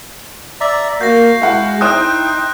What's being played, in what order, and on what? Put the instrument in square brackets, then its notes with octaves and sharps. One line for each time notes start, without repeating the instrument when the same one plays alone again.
[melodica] D5 E5 A#5
[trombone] A#3 [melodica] F#4 F5 [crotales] G6 A#6
[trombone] G#3 [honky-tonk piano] E4 F#5
[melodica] D#4 [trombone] E4 [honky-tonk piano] C5 G5 D#6 [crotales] F#6